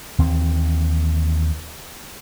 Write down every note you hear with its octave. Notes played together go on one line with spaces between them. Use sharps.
D#2 E3 C4